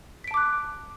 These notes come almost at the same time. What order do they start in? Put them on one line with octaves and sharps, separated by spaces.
B6 D7 A5 D6 F#6